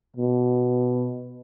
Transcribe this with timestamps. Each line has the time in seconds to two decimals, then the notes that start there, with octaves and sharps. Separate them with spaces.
0.16 B2